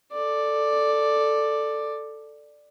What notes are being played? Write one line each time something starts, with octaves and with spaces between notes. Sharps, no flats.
A4 D5